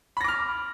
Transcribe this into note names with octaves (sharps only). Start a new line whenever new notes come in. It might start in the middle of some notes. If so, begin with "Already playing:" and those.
B5 D6 F6 A#6